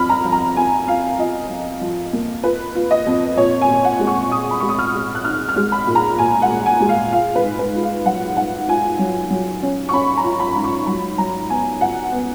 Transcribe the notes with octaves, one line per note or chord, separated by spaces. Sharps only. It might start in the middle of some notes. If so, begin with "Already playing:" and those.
Already playing: F2 B5 F6
A#5
F3
A#5
F2 G#5
F4 F5
F4 D#5
F3
F3
A#3
F4 B4
F4
D#5
F2
A#2 C#5
G#5
A#2
F#5
G#3
C#6
A#2 D#6
B5
G#3 C#6
D#6
F6
G#3
F#6
D#4 F6
F6
G#3
B5
A#2
A#5
A#2 G#5
F#5
A#2
G#5
G#3
F5
F4 F5
B4
G#2
B4
F4
F5
F#3 F#5
G#2 F#5
F4 G#5
F#3
F#3
C#4
C#6
C#4 B5
A#5
F4
B5
G#2
C#6
F#3 B5
F#3 A#5
B3 G#5
C#2 F#5
B3